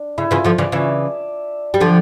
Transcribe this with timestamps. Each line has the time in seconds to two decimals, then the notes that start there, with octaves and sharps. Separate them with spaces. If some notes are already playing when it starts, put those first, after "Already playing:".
Already playing: D4
0.18 C#3 E4
0.31 C#3 E3 F4
0.44 D3 F3 F4
0.58 C#3 E3 D5
0.72 C#3 E3 E5
1.74 G3
1.80 D3 F3